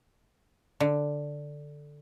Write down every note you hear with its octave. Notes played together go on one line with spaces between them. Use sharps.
D3